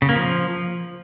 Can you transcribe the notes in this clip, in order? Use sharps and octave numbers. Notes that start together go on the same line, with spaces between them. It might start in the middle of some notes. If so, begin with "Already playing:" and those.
C#3
A#3
F3